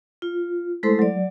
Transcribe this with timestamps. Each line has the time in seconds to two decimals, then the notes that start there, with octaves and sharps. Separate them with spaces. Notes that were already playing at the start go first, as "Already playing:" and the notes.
0.22 F4
0.83 G#3 A3 E4 A4 C5 C6
0.99 F#3 D5